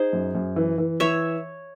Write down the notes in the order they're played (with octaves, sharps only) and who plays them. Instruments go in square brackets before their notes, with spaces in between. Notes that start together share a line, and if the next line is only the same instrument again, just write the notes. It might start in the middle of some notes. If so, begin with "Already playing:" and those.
Already playing: [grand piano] D#4 [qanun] G#4 C5
[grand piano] F#2
F#2
E3
E3
[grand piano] E3 [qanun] C#5 E5